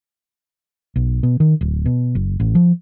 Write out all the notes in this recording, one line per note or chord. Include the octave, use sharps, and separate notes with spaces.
B1
B2
D#3
D1
B2
F#1
A1
F3